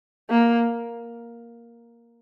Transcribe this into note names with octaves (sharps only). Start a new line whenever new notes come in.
A#3